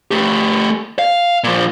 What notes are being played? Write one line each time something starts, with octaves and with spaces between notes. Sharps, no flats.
A3 G4
F5
A#2 F3